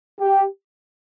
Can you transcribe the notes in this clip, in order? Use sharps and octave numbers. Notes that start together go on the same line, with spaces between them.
G4